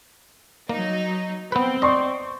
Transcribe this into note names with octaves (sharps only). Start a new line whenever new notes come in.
F#3 A#3 D#4
B3 C4 B4
D5 D#5 C6 C#6